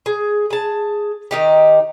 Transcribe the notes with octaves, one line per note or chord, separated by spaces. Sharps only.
G#4
G#4 A5
D#3 D#4 G4